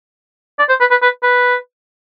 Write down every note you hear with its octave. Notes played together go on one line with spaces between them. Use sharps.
D5
C5
B4
B4
B4
B4